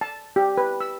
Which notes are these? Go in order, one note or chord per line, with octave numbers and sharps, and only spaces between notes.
A5
G4
B4
E6